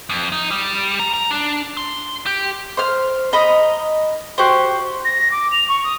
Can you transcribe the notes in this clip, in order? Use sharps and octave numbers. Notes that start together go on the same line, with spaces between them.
F2
D#4
G3
A#5
A#5
D4
C6
G4
C5 F6
D#5 A#5 B5 D#6
F#4 G4 C5
A#6
D6
F7
C#6
D#6